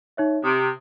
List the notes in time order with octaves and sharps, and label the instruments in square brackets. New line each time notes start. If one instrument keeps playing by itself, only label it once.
[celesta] D#4 C#5 E5
[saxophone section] C3 [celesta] D#6 D7